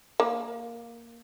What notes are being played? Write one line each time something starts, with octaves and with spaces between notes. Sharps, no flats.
A#3